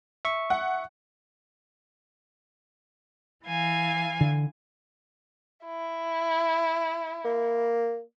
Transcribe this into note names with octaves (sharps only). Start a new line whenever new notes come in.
E5 C#6
F#5
E3 F5 G#5
D3
E4
A#3